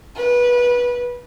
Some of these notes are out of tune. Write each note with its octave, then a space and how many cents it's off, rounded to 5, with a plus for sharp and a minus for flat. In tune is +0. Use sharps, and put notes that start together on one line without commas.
B4 -20